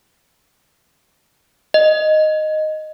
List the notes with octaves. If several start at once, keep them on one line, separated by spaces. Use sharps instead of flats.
D#5